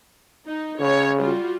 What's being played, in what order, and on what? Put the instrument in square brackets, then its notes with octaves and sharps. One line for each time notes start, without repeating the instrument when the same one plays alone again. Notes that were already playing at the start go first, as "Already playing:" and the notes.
[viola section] D#4
[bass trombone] C#3 [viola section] C#5
[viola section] G3 F4 F#4